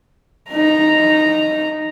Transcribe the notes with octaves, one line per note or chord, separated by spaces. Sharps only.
D#4 A#5